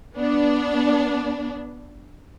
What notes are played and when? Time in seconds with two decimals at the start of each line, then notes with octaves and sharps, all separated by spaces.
0.16 B3 D4